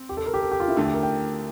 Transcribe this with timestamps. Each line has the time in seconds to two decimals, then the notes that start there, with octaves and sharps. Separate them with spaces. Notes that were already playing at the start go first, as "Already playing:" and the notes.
Already playing: C4
0.09 G4
0.17 A4
0.26 A#4
0.34 G4
0.42 A4
0.52 G4
0.60 F4
0.68 E4
0.76 D2 D3 A3 F4
0.85 G4
0.94 A#4
1.03 G5